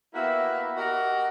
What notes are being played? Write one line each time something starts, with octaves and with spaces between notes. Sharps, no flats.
A#3 B3 E4 F#4 G4 E5
F#4 G4 A#4 D#5 F#5